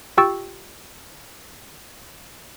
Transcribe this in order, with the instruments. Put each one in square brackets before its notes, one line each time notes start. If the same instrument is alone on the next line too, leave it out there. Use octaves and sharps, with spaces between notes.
[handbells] F4 G4 G5 C#6 E6 A6